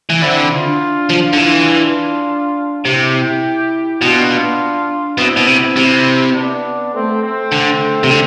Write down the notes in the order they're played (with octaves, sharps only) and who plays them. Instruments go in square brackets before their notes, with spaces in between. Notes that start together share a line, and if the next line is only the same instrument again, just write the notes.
[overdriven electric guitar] E3
[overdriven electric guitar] D3 [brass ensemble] C4 E4
[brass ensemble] D4 F4
[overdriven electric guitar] F3
D3
E3
[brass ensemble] D4 F4
[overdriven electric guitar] C3 [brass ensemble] E4 G4
[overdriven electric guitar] B2 [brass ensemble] D4 F4
[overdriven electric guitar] B2 [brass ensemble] C4 E4
[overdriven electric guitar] B2
C3
C3
[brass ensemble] B3 D4
A3 C4
A3 C4
[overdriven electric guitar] D3
C3
D3